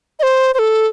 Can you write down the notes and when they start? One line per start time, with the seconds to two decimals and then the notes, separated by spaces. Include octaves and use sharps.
0.19 D#5
0.23 C5
0.54 C5
0.59 A4